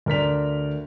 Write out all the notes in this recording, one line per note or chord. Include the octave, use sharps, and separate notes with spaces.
D2 A#4 D5 B6 F7